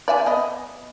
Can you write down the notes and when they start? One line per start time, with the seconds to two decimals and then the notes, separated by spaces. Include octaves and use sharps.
0.08 D5 E5 G#5
0.26 B3 D#5